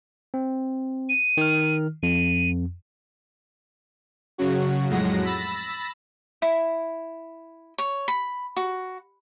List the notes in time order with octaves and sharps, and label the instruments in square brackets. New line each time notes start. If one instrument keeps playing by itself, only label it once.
[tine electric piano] C4
[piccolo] D#7
[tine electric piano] D#3 F6
[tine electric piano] F2 [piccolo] D#7
[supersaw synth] C#3 F#3 F#4
F2 A2 F#3 G#3 F#5 A#6
B5 E6 A6 A#6
[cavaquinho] E4
C#5
B5
F#4